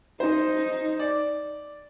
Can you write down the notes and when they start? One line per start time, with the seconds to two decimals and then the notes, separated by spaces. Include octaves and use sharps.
0.20 D#4 C5
1.00 D5